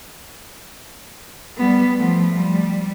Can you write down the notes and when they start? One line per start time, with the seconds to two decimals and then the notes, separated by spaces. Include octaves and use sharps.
1.57 G3 B3
1.97 F3 A3
2.38 G3